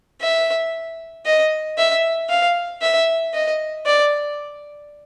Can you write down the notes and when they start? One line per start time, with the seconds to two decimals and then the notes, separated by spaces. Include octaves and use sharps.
0.21 E5
1.26 D#5
1.78 E5
2.29 F5
2.82 E5
3.34 D#5
3.86 D5